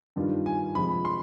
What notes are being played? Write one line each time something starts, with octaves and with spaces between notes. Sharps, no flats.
G2 D#3 G3 D4 F4
G#5
C3 F3 G#3 B5
C6